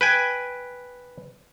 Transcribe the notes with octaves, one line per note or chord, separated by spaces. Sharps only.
B4 G5 G#5